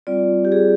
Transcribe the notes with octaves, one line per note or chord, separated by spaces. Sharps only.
G3 C4 F4 D5
G4
G#4